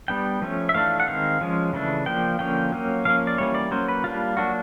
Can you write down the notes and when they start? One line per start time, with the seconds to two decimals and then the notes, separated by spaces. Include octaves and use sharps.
0.08 G3 B3 D4 G5
0.42 F3 A3 C#4
0.69 E5
0.74 E3 A3 D4 F5
1.00 F#5
1.07 D#3 G#3 C4 F5
1.41 F3 G#3 C#4
1.73 C#3 E3 A3 D4
2.06 F3 A#3 D4 G5
2.39 D3 F3 A#3 C#4 G5
2.72 F#3 A#3 C#4
3.05 F3 A#3 C#4 F5
3.27 D5
3.38 E3 G3 A#3 C#4 C#5
3.55 D5
3.71 F#3 A#3 C#4 C5
3.88 B4
4.04 G3 A#3 D4 F4
4.37 F#3 A#3 D4 F#4